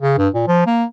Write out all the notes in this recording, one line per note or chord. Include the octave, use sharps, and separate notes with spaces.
C#3
G2
A#2
F3
A#3